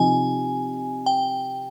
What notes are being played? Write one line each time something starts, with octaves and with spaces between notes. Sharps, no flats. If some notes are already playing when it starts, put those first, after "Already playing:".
Already playing: C3 F3 C4 D#4 G#5
G5